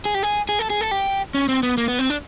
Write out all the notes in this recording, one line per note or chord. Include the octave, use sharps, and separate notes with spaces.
G#4
G4
G#4
G#4
A4
G#4
A4
G4
C#4
C4
B3
A#3
B3
C4
D4